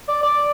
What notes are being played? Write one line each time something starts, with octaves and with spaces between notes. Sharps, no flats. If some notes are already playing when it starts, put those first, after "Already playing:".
D5
D5